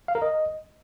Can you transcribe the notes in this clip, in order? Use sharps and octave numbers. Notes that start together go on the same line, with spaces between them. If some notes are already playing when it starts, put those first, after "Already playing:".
F5
A#4
D#5